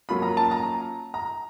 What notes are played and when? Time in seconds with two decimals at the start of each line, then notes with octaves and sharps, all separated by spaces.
0.09 F#3 A#3 C#4 F4 B5
0.22 A#5
0.37 A5
0.51 A#5
1.14 A#5